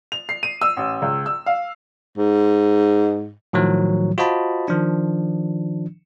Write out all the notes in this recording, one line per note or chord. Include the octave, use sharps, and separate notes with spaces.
F7
C7
D#7
E6
A1
C#2
E6
F5
G#2
A2 D#3 F3 F#3
F4 F#4 C5 D#5 A5 B5
D#3 F3 D4